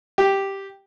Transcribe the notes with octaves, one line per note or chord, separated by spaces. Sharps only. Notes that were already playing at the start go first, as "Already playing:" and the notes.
G4